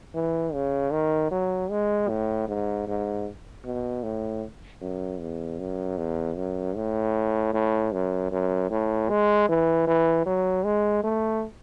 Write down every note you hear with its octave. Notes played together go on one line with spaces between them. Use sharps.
E3
C#3
D#3
F#3
G#3
A2
G#2
G#2
B2
A2
F#2
E2
F#2
E2
F#2
A2
A2
F#2
F#2
A2
G#3
E3
E3
F#3
G#3
A3